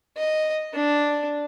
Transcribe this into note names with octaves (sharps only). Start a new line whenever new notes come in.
D#5
D4